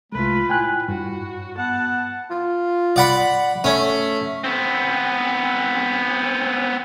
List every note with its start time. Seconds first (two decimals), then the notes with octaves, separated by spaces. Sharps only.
0.12 C2 G#3 A3 F4 B4
0.50 A2 G5 G#5 F#6
0.89 G2 F#4
1.58 B3 F#5 A5
2.30 F4
2.96 D5 F#5 B5
3.64 A3 C#4
4.44 B3 C4